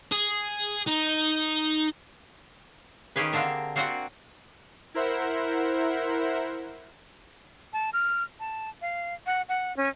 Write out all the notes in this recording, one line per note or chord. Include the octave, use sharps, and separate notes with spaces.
G#4
D#4
D#3 C#4 G4 G#4 B4
D3 A#3 C4 D4 A#5
A#3 C4 F#4 D5 F#5 G5
E4 A#4 C5 E5 F#5
A5
F6
A5
F5
F#5
F#5
C#4